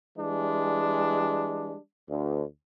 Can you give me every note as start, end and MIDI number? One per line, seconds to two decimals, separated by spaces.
0.18 1.77 52
0.18 1.77 55
0.18 1.77 56
0.18 1.77 62
2.09 2.43 38